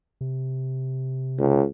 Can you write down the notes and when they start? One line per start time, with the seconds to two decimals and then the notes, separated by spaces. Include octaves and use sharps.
0.21 C3
1.38 C#2